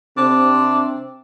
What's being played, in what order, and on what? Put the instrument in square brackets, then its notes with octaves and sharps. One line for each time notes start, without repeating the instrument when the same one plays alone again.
[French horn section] C3 C4 [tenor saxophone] D4